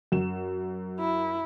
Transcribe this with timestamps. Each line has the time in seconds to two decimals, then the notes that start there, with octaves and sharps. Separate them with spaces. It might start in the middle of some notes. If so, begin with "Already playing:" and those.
0.12 F#2 E7
1.00 E4